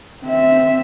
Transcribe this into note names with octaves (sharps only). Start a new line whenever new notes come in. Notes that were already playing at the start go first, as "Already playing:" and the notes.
C4 E5